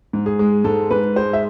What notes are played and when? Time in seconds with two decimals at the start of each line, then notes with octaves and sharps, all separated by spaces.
0.13 G#2
0.26 G#4
0.39 G#3
0.64 G#2 A4
0.91 G#2 B4
1.16 G#3 C5
1.33 E5